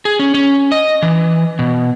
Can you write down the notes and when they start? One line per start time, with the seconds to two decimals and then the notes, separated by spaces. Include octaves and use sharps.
0.05 G#4
0.19 C#4
0.34 C#4
0.72 D#5
1.02 E3
1.59 B2